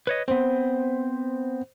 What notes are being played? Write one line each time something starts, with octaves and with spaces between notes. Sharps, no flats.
B4 C#5 D#5
B3 C4 C5